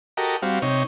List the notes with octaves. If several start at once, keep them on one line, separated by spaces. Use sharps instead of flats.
F#4 G4 A4 A#4 D#5
G3 C4 F#4 F5
C3 D#4 C#5